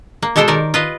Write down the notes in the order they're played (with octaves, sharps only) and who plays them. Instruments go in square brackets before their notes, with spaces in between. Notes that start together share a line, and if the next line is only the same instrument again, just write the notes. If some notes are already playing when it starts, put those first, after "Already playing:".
[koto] A#3
B2 G#3 G4 A4 C5 G5
D#3 A#4 D5
F4 B4 D#5